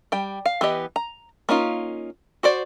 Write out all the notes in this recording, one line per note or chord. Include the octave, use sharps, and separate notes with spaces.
G3 G5
F5
E3 B3 G4 D#5
A#5
A#3 C#4 D#4 F4
F#4 C5 D5